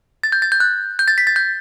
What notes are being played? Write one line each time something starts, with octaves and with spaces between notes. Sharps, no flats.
A6
G6
A6
G6
F#6
G6
A6
B6
A6
G6